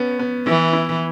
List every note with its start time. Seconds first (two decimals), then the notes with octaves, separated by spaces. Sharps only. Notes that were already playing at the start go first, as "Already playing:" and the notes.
Already playing: B3 C#4
0.19 B3
0.47 E3 E4
0.73 E4